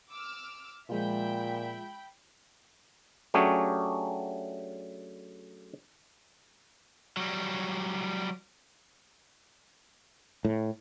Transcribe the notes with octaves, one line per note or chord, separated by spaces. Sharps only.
D6 E6 F6
A#2 F3 G#3 F4 E5 G5 B5
F#3 A3 C#4 D4 G4 G#4
F#3 G3
A2